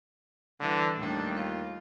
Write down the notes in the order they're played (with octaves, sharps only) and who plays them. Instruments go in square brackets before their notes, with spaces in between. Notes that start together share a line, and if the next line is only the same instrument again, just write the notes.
[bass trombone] D3 [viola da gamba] E3 G3
[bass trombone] D#2 [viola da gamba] A2 G3 D4
[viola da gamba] F4